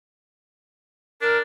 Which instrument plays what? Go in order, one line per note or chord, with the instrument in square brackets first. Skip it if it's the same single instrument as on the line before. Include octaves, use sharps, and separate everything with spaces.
[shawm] D4 [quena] A#4